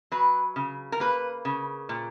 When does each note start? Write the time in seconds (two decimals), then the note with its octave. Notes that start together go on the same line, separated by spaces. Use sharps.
0.12 F#3 B4
0.56 C#3
0.92 A#4
1.00 A#3 B4
1.45 C#3
1.89 A#2